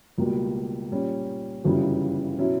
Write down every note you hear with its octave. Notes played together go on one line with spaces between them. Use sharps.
C#2 B2 G3 A#3
A#2 G3 C#4
G1 F#2 C#3 E3 G3
B2 F#3 C#4 E4